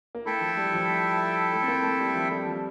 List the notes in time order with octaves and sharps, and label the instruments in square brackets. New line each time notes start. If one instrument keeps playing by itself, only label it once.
[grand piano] A#3
[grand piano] A3 [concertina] E4 A4 E5 G5
[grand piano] F3
G3
F3
A3
A3
C4
A#3
A3
G3
F3
G3
F3